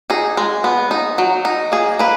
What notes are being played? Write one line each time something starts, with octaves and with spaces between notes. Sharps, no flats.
D#4 G#4
G#3
B3
D#4
F#3
D#4
A#3 G#4
A#3 B4